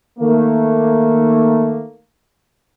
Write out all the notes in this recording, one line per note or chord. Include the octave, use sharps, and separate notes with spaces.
D#3 A3 A#3